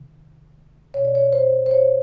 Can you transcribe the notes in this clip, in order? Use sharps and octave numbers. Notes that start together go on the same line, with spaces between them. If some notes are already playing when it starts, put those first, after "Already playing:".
Already playing: C3 D#3
B2 C#5
D5
C#5
C5
C5
C#5